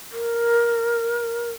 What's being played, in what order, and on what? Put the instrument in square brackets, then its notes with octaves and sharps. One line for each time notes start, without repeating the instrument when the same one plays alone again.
[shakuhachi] A#4